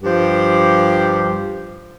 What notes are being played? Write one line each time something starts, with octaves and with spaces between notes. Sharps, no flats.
G2 F3 G4